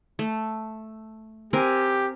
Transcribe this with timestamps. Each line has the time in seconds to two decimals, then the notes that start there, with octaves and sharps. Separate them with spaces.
0.19 A3
1.53 C4 G4 A#4 G#5